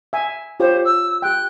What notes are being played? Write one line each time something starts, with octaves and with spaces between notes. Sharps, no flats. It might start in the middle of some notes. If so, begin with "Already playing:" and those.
E5 G#5
F4 G4 C5 C#5
E6
G4 G5 F#6